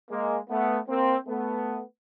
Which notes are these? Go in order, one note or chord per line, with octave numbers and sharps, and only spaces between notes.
G#3 A#3
A3 B3
A#3 C4
A3 B3